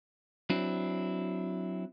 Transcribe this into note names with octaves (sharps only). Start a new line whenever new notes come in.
F#3 C4 D4 E4